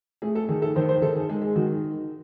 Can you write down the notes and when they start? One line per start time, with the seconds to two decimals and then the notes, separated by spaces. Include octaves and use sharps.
0.22 A3 G#4
0.35 A4
0.49 D#3 G#4
0.62 A4
0.76 D#3 C5
0.89 C5
1.02 D#3 A4
1.15 G#4
1.29 G#3 G#4
1.42 G#4
1.56 D#3 F#4